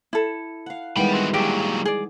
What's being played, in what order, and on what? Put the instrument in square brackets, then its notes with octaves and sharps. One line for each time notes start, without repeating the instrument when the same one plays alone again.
[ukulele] E4 A4
[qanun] F5 F#5
[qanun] D#3 E3 B3 [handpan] G3 G#3 [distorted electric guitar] G5 B5
[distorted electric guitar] C4 F#4
[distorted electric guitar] A#2 F#3 [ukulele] G4 [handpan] G#4
[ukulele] G#4 D5